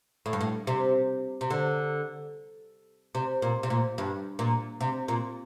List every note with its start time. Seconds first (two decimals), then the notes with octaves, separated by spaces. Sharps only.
0.26 A2
0.33 G2
0.41 A2
0.67 C3
1.41 C3
1.50 D3
3.15 C3
3.42 A#2
3.63 C3
3.70 A#2
3.98 G2
4.39 A#2
4.81 C3
5.08 A#2